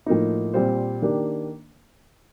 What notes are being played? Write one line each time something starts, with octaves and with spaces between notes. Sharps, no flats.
A2 F3 A#3 D#4
A#2 G3 C4 F4 C5
D#3 A#3 D4 G4